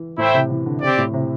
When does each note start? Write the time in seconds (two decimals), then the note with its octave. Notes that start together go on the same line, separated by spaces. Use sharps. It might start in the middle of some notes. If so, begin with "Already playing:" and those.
Already playing: E3
0.18 A2 A3 E4 C5 E5 G5
0.34 C3
0.50 E3
0.66 D3
0.81 C3 C4 G4 D5
0.98 A2
1.14 C3